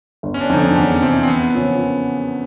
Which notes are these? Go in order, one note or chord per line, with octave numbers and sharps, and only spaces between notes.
G1
C#4
D4
F2 D3 D#4
D4
E2 C#4
C#4
C3 E3 C4
C4
E2 B3
C#3 F3 A#3 C#4